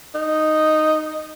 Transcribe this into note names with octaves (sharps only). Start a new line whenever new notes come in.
D#4